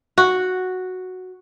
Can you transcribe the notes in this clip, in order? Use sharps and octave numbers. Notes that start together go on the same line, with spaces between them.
F#4